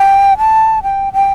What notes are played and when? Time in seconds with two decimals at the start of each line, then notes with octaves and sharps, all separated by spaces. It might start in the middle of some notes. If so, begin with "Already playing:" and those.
Already playing: G5
0.38 A5
0.83 G5
1.13 G5